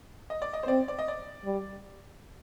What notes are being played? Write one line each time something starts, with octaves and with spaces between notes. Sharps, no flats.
D#5
D5
D#5
C5
C4 D5
D5
D#5
D5
G3